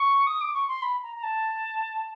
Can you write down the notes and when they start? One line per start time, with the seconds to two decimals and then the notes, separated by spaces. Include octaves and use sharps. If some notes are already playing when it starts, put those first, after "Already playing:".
Already playing: C#6
0.27 D#6
0.41 D6
0.54 C#6
0.68 C6
0.82 B5
1.03 A#5
1.16 A#5
1.23 A5